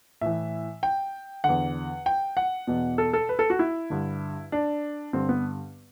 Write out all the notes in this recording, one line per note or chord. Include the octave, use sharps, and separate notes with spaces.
A2 E3 E5
G5
E2 D3 F#5
G5
F#5
E2 B2
A4
A4
B4
A4
F#4
E4
G2 D3
D4
G2 D3 C4
B3